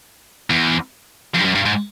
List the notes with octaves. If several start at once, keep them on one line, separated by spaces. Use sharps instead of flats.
E2
F2
G2
F#2
G2
G#2